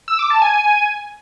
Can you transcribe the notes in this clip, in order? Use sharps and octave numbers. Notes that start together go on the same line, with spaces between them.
E6
D6
A5
G#5